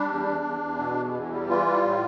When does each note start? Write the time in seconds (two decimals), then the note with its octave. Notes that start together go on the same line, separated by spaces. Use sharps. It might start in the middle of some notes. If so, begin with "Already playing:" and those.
Already playing: G3 D4
0.09 E2
0.26 E2
0.44 E2
0.61 E2
0.79 B2
0.97 E2
1.13 E2
1.31 G3
1.49 E3 F4
1.66 G3
1.84 A2